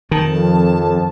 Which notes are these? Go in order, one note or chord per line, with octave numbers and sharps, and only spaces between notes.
F2 D#3 A5